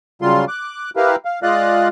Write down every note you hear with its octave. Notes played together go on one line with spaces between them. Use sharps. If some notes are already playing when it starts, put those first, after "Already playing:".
C#3 F#3 G3 F4 C6
D6 F#6
E4 G4 A#4 B4 F5
F5
G#3 F4 D5 D#5 F5 F#6